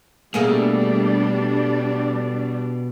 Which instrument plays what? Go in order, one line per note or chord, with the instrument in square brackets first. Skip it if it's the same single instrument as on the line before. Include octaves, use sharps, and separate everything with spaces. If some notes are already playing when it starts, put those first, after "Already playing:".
[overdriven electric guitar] B2 [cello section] G3 D4 [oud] A3 A#3 G#4